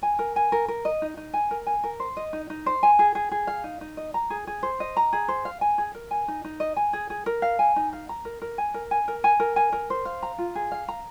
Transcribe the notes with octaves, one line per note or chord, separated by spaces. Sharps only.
G#5
A#4
G#5
A#4
A#4
D#5
D#4
D#4
G#5
A#4
G#5
A#4
C5
D#5
D#4
D#4
C5
G#5
G#4
G#4
G#4
F5
D#4
D#4
D#5
A#5
G#4
G#4
C5
D#5
A#5
G#4
C5
F5
G#5
G#4
A#4
G#5
D#4
D#4
D#5
G#5
G#4
G#4
A#4
F5
G#5
D#4
F5
A#5
A#4
A#4
G#5
A#4
G#5
A#4
G#5
A#4
G#5
A#4
C5
F5
A#5
F4
G#4
F5
A#5